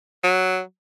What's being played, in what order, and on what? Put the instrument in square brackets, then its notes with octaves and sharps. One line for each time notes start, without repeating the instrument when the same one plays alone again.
[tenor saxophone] F#3